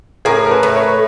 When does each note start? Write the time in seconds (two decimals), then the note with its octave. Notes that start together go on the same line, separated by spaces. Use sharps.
0.25 A2 G#4 A#4
0.46 A#4
0.51 A4 B4
0.63 A2
0.75 B4 C#5